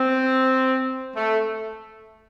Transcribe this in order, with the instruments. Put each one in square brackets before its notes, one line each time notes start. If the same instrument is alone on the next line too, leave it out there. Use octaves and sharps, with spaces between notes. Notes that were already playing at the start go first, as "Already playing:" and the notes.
Already playing: [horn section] C4
A3